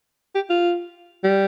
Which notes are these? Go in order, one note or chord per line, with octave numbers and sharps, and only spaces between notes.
G4
F4
G3